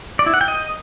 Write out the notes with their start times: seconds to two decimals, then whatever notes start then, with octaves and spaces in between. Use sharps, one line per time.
0.19 D5
0.26 E4
0.34 F#5
0.41 G5
0.48 D#5